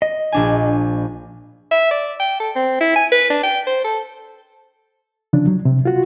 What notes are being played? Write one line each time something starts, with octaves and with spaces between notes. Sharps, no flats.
D#5
A#1 D4 G#5
E5
D5
G5
A4
C4
E4
G#5
B4
D4
G5
C5
A4
C#3 F3 D4
F#3
C3
F4 F#4